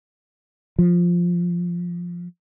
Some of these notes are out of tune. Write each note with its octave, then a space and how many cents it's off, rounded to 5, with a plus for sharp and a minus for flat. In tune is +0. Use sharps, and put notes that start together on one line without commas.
F3 +0